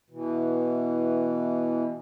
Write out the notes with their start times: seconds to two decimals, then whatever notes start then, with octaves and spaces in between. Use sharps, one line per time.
0.10 B2 E3